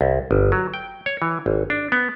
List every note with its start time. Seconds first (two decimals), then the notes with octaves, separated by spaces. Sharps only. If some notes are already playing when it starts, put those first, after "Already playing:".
0.01 C2
0.31 G1
0.52 F#3
0.74 G5
1.06 C#5
1.22 E3
1.46 G#1
1.70 D4
1.92 B3